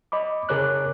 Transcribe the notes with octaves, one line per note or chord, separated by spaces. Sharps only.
D#5 B5 D6
C#3 G#4 A#4 C#5 D6 F#6